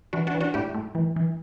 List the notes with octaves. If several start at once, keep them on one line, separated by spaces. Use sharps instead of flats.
E3 D4 F#4
D4 F#4
E3
D4 F#4
A2 E4 G4
A2
E3
E3